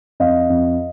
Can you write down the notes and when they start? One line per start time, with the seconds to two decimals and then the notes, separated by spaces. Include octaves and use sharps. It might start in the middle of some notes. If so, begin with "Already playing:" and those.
0.20 F2 D#5 F5
0.50 F2